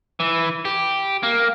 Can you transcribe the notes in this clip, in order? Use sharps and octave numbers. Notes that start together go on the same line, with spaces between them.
E3
G4
A#3